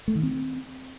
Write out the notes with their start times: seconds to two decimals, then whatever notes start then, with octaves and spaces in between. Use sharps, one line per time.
0.08 A3
0.15 D#3
0.23 C4